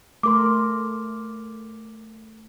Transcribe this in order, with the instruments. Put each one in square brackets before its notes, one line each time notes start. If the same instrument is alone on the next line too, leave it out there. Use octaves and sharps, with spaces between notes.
[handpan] A3 A#4 [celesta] C6 D6